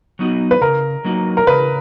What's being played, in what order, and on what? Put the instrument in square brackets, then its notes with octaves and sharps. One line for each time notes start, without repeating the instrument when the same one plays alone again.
[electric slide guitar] F#3 B3 D#4 F#4
[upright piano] B4
[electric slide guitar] C#3 [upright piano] A#4
[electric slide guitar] F#3 A#3 D#4 F#4
[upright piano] A#4
[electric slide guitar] C#3 [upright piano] B4